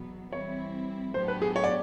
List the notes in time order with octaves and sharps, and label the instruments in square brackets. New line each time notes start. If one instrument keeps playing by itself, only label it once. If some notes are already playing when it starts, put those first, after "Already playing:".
Already playing: [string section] E2 B2 F#3 B3
[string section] E3 G3 C4 E4 [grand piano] C#5
[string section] A2 F#3 B3 D4 G4 [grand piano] C5
[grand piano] B4
G#4
C#5
D5